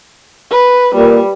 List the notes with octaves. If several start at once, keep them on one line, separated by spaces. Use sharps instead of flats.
B4
A#2 G3